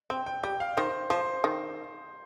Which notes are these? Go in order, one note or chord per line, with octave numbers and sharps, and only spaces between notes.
C4 G5
G5
G3 G5
F5
D#3 C5
F3 C5
D#3